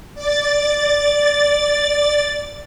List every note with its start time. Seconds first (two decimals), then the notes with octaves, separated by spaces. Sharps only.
0.15 D5 A6